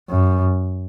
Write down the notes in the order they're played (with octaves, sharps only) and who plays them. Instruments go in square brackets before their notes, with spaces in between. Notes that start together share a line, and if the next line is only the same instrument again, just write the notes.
[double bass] F#2